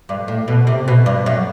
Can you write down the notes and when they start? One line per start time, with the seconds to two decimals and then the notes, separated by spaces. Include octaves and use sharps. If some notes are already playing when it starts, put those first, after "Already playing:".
0.09 G2
0.28 A2
0.48 B2
0.67 C3
0.88 B2
1.06 G2
1.26 F#2